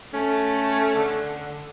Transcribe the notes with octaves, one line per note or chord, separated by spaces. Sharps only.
A3 C#4
D3